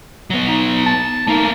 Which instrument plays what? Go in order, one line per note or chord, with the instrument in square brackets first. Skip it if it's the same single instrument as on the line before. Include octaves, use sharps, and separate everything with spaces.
[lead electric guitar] F#3 B3
[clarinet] D#4
A5
[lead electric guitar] A3 A#3 [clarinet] D#4